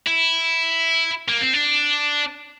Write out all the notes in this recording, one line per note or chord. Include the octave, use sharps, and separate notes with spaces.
E4
A#3
C4
D4